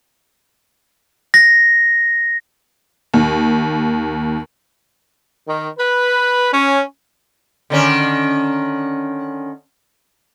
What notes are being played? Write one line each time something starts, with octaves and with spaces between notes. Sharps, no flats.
A#6
D#2
D#3
B4
C#4
D3 D#3 C#4